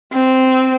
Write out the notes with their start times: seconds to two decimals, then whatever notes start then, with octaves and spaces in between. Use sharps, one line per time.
0.13 C4